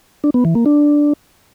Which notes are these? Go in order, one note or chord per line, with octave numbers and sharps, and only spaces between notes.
D4
B3
E3
A#3
D4